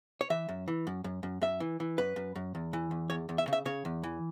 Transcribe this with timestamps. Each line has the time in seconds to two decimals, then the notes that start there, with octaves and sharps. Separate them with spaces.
0.21 C#5
0.30 E3 E5
0.49 F#2
0.68 E3
0.87 F#2
1.04 F#2
1.23 F#2
1.41 F#2 E5
1.60 E3
1.80 E3
1.98 F#2 B4
2.16 F#2
2.36 F#2
2.55 E2
2.73 E3
2.91 E2
3.10 E2 C#5
3.29 E2
3.38 E5
3.48 C#3
3.53 E5
3.65 C#3 C#5
3.85 E2
4.03 E3